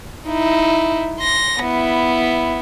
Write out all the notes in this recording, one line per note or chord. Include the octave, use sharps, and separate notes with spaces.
D#4 E4
C6 A#6
B3 E4